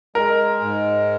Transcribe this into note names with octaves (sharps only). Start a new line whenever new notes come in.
G#3 A#4
G#2